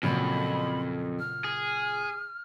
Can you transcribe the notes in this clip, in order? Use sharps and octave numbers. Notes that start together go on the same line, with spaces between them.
F2 A#2 C#3 F#3 B5
F6
G#4